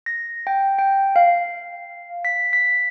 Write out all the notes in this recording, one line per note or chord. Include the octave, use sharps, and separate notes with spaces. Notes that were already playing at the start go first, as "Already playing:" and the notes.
A#6
G5
G5
F5
B6
B6